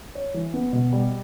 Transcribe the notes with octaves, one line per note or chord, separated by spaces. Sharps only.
C#5
E3
B3
B2
G3